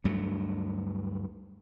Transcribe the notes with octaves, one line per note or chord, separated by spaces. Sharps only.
D2 G2 F#3 A3